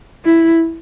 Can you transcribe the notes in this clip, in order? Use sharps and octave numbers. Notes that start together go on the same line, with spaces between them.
E4